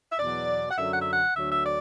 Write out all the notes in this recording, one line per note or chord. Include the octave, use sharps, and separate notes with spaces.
E5
E2 B2 F#3 D5
F#5
F#2 D3 F#3 E5
F#5
E5
F#5
D2 D3 F#3 E5
E5
D5